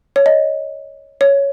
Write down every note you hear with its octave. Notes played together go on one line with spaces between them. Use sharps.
C#5
D#5
C#5